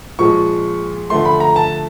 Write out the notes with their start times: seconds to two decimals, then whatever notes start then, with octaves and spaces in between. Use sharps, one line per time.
0.19 A#2 F3 G#3 C#6
1.10 D3 F3 A3 C6
1.25 B5
1.40 A#5
1.56 A5